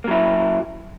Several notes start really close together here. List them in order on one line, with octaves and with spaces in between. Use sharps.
A#3 F#3 E4